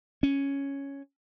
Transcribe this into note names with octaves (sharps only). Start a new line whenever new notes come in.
C#4